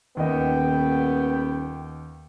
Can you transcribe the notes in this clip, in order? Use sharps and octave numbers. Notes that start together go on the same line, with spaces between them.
D#1 D#2 B3 D#5 G5